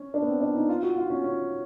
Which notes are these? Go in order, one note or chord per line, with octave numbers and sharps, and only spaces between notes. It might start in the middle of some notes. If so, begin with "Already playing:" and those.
Already playing: C#4
D4
B3
C4
D4
D#4
F4
F#4
F4
C#4
C#4